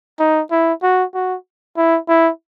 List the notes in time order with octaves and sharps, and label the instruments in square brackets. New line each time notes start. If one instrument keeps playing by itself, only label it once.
[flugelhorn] D#4
E4
F#4
F#4
E4
E4